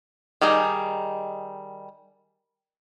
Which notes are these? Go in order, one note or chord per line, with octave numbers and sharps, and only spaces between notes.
D#3 G3 D#4 G#4